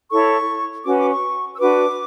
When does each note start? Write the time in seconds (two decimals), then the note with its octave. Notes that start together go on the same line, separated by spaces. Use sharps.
0.11 E4 A4 C#5 C#6
0.85 C#4 F#4 B4 D6
0.97 D6
1.10 C#6
1.53 E6
1.59 D4 F#4 B4 D6